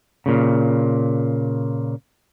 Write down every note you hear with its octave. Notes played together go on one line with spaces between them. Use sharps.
A#2 C#3